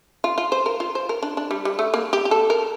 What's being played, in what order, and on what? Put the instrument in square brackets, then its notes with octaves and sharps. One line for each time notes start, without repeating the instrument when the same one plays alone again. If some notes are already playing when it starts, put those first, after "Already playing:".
[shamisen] F4
F4
C5
A#4
F4
C5
A#4
D4
D4
G3
G3
A3
A#3
G4
G4
A4
A#4